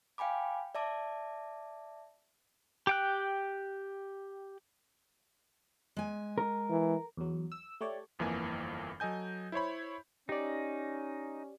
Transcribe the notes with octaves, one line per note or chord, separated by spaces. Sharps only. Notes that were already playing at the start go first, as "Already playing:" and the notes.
F5 G5 G#5 B5 D6
D5 E5 A5 D6
G4 G5 F#6
G#3 G#5
A#4
E3
E2 F#3
E6
A3 G4 C#5 D5
G1 F2 E3 A#3 G#5
F#3 A4 D#5 G#5 G6
E4 C5 C#5 B5
C#4 D#4 G4 D5